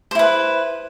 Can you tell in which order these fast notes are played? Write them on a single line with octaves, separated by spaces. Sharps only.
C5 E4 B4